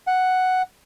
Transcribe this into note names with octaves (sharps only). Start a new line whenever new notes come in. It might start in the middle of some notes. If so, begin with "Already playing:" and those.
F#5